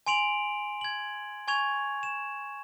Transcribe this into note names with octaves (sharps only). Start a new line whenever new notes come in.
G#5 C6 D7 F7 F#7
G#6 F#7
G#5 C#6 G#6 F7
E7